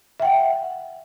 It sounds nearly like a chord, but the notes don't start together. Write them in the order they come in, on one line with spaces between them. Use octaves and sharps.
E5 G5 F#5